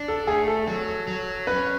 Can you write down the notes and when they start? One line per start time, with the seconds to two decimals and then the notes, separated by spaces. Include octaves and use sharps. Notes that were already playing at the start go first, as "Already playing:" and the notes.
Already playing: D4
0.08 A4
0.27 A3 G#4
0.48 A4
0.68 F#3
1.08 F#3
1.47 C#4 B4